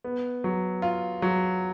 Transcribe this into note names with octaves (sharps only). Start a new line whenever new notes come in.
B3
F#3
F4
F#3